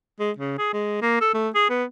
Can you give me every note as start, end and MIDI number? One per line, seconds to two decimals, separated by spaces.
0.20 0.31 56
0.38 0.56 49
0.59 0.72 68
0.73 0.97 56
1.02 1.16 58
1.21 1.30 69
1.34 1.49 57
1.55 1.67 68
1.70 1.84 59